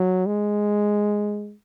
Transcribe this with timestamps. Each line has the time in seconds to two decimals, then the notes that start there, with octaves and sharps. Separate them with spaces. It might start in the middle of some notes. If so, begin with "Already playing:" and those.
Already playing: F#3
0.26 G#3